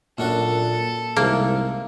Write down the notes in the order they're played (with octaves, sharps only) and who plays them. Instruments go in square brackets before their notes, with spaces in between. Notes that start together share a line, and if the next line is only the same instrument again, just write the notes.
[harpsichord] F#2 D4 F#4 [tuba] A#2 [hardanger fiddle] A4
[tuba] C2 [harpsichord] G#2 C3 [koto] A#3